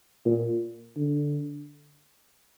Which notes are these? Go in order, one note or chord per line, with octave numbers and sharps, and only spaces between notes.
A#2
D3